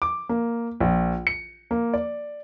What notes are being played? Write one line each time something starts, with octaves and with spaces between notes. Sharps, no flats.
D6
A#3
A#1
C#7
A#3
D5